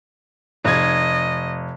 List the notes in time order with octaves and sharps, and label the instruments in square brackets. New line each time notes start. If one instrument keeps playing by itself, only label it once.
[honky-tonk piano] F1 G#6 [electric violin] D#5